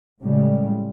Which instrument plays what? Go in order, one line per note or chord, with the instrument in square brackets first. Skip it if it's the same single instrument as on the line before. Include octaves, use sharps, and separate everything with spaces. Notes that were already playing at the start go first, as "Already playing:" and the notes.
[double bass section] A2 C#3 G3 G#3